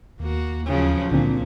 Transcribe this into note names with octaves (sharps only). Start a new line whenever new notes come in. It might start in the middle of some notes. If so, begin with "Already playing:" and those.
D#2 A#3 F#4
C#3 F3 F#3
C#2 A#2 D3 C4